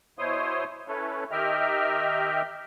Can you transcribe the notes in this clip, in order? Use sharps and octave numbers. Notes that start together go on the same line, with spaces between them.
B2 E4 C5 C#5 C6 D#6
C#4 E4 A4 B4 C#5
D#3 G4 D#5 E5 G5 F6